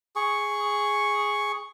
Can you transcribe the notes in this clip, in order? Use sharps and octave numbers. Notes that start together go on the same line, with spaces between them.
G#4 C#6